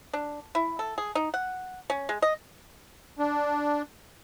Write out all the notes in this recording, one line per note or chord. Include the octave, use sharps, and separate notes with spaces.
D4
E4
A4
G#4
D#4
F#5
C#4
G#3
D#5
D4